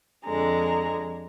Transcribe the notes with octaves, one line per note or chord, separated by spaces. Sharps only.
F2 D3 G#3 A#5